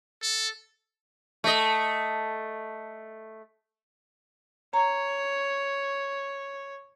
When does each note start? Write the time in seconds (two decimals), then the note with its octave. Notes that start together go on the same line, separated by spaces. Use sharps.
0.22 A4
1.44 A3 D#5
4.74 C#5 A#5